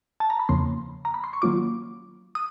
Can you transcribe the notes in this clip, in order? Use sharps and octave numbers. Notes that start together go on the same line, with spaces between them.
A5
A#5
B5
E2 C#3 F3 A#3 C6
A#5
B5
C6
C#6
D#3 F#3 A#3 C#4 F4 D6
D#6